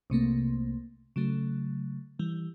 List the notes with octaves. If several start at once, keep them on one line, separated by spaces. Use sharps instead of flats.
C2 C3 A3 A#3
C#3 F#3 A3
E3 G3